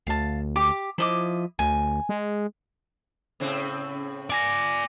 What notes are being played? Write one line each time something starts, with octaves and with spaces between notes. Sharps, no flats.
D2 F5 A5
G4 D6
F3 E4 D#5 D6
D2 G#5
G#3
A2 C#3 C4
D5 G#5 D6 A#6